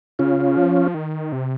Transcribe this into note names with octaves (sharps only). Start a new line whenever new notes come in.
C#3 C#4 F4
F3
D#3
C3